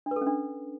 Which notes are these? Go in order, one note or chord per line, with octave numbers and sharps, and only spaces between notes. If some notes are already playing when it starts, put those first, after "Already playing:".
D4
B4
A4
C#4
D4